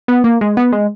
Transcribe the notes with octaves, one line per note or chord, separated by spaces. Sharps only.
B3
A#3
G#3
B3
G#3